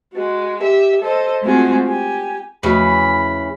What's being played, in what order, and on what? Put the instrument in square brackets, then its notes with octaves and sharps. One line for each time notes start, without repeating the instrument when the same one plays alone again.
[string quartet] G#3 F#4
G4 E5
A4 C5 D#5
G#3 A3 C4 F4 F#4 G#4
G4 G#5
[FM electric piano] E2 [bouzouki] C#3 E3 [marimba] F3 A3 F#4 [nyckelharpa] B5